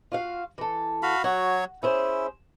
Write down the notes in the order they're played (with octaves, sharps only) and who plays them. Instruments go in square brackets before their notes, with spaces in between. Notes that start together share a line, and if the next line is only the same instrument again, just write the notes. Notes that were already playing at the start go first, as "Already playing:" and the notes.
[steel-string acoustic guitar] F4 F#4 F5
E3 A4
[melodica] F#4 F5 B5
[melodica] F#3 C#5 [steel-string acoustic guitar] F#4
[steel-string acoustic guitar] C#4 G#4 C5 [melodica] E4